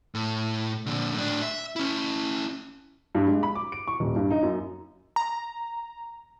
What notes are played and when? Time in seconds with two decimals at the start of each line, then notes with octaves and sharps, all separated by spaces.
0.15 A2
0.86 A#2 D3
1.14 A2 D4
1.42 E5
1.76 C#4 E4
3.15 G2
3.27 G#3
3.43 B5
3.55 D6
3.72 D7
3.87 C#6
4.00 D#1
4.16 G2
4.31 D#4
4.43 F#2
5.16 A#5